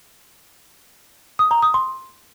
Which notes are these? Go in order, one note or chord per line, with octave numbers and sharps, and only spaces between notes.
D#6
A#5
D#6
C6